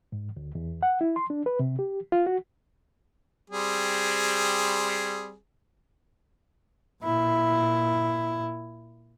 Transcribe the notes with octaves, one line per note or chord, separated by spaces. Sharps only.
G#2
D2
E2
F#5
E4
C6
D4
B4
C3
G4
F4
F#4
G3 C4 G#4
A#2 E4